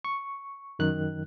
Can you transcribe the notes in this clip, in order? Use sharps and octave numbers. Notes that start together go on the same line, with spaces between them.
C#6
F#2 D#3 F#6